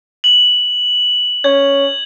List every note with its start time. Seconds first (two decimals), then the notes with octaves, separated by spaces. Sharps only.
0.24 F#7
1.44 C#4 G#6